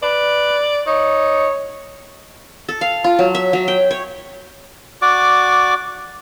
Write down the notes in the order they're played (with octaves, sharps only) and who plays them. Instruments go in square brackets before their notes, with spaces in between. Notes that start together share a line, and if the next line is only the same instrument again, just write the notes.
[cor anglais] B4 [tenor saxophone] D5
[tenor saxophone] D#4 [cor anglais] C#5
[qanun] A4
F5
F4
F#3
E5
F#3
G5
C#5
[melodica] F#4 D5 D6